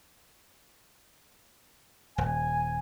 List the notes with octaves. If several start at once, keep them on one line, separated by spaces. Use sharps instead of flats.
D#1 G#5